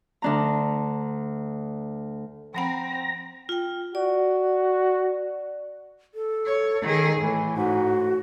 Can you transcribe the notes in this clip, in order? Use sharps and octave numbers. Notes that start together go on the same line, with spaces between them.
D2 D4 A#5
F3 C4 F#5 A#5 B5
F4 G5
F#4 D5
A4
C#5
D#3 G#4
A2 E3
G#2 F#4